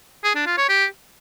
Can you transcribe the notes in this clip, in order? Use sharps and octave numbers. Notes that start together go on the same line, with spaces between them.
G#4
D4
F4
C#5
G4